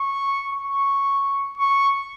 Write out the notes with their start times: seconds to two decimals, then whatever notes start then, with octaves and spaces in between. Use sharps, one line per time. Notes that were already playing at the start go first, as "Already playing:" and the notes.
Already playing: C#6
0.52 C#6
1.58 C#6